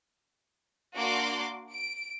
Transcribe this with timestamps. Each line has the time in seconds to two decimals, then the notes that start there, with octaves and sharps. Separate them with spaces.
0.96 A#3 D4 F#4 D5 C6 D6
1.71 D7